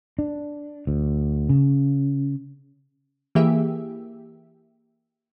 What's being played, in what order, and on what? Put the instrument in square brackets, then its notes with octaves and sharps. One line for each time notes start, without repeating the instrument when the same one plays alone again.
[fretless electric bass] D4
D2
C#3
[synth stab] E3 A#3 G4 G#4 E5